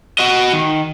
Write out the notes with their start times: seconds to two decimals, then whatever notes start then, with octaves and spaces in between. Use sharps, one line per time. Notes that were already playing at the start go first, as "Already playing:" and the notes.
0.19 F#4 D#5
0.52 D#3